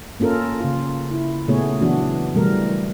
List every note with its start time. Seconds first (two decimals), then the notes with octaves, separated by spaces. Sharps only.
0.20 A#3 C#4 F4 A4 A#4
0.60 C#3 F4
1.11 E4
1.48 A#2 C#3 A3 B3 G#4 C#5
1.81 E3 F#3 B3 D4 F#4
2.35 B2 E3 G3 A3 A#4